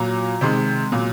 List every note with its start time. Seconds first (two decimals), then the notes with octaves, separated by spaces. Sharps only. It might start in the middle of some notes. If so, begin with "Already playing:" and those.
Already playing: A#2 F#3 A#5
0.41 C3 D#3 G#3 C6
0.92 A#2 F#3